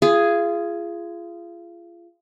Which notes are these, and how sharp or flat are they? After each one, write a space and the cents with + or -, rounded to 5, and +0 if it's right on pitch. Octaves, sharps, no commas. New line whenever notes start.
F4 -30 G#4 +0